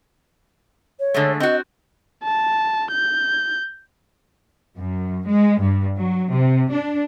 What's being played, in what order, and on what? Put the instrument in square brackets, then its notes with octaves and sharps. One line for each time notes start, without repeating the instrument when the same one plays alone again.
[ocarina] C#5
[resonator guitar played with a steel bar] D3 G#3 A3
[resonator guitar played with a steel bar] C4 F#4 [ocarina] D#5
[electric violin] A5
G6
[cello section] F#2
G#3
G2
F#3
C3
D4